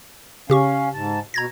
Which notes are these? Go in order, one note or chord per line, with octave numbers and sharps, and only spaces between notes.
C#3 C#4 G4 F5 C#6
G#2 A5
B2 A#5 G#6 A#6